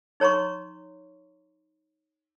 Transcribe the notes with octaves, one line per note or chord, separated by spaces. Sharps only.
D#4 C#5 A#5 C6 C#6